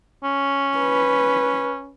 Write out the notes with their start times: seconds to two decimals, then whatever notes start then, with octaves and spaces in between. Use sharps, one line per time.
0.24 C#4
0.78 B4